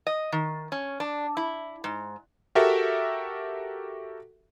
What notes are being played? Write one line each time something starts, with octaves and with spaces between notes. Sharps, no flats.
D#5
D#3
C#4
D4
E4
G#2
F#4 G4 A4 A#4 E5